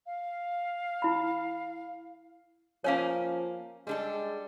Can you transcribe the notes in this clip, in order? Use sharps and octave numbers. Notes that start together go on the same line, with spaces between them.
F5
E4 B5
F3 A#3 C#4 C#5 F5 G#5
G3 G#3 D4 A4